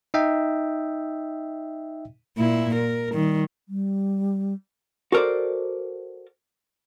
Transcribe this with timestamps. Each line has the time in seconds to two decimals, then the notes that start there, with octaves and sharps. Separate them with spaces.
0.14 D#4 D#5 E5 G5
2.38 A#2 E4
2.76 A#4
3.14 D#3 G3
3.69 G3
5.12 F#4 A4 A#4 C5 D5